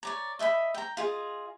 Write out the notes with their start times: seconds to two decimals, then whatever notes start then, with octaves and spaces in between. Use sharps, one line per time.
0.03 C#5 D5 A#5
0.39 D#5 E5 G5 B5
0.74 G5 A#5
0.97 F4 G#4 D#5